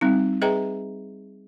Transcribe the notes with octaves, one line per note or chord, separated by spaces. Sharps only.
G3 C4 D#4
G#4 B4 D#5 E5 G5 A#5